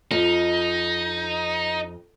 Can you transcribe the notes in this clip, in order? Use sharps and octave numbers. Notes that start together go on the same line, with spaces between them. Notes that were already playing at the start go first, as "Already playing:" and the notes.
F2 D#4